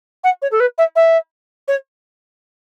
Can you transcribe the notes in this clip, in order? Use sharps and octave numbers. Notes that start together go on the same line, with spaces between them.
F#5
C#5
A4
B4
E5
E5
C#5